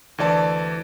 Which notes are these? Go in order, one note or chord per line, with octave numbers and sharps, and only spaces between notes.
D2 E3 D5 A5